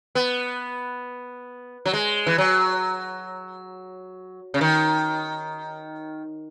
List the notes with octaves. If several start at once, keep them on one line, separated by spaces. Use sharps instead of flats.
B3
F#3
G#3
E3
F#3
C#3
D#3